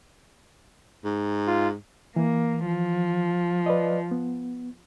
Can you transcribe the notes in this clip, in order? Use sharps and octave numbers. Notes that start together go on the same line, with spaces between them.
G#2
F4
E3 A#3
F3
B4 D5 D#5
B3